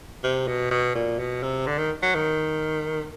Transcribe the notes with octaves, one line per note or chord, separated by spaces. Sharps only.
C3
B2
B2
A#2
B2
C3
D3
D#3
F#3
D#3